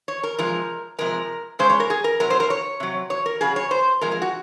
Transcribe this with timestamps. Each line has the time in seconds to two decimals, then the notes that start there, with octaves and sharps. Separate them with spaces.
0.08 C#5
0.23 A#4
0.39 C3 F3 G#3 A#4
0.99 C3 F3 G#3 A#4
1.59 C#3 G#3 C5
1.70 C#5
1.80 A#4
1.90 G#4
2.04 A#4
2.20 C3 F#3 A#4
2.30 C5
2.40 A#4
2.50 C#5
2.80 C3 F#3
3.10 C#5
3.26 A#4
3.41 C#3 F#3 G#4
3.56 C#5
3.71 C5
4.01 C3 F3 G#3 A#4
4.11 A#4
4.22 F#4